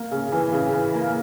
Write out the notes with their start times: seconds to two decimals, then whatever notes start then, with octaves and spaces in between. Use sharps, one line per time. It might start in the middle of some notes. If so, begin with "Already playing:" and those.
Already playing: A#3
0.11 C#3
0.32 E3
0.52 C#3
0.73 E3
0.94 A#3